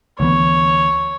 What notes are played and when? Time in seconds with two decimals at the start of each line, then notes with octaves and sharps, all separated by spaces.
0.20 D2 E3 B3 C#5